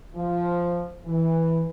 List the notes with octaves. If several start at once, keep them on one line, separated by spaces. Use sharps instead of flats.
F3
E3